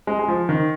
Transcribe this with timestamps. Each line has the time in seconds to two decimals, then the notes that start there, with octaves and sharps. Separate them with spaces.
0.07 G#3
0.19 G#3
0.28 F3
0.49 D#3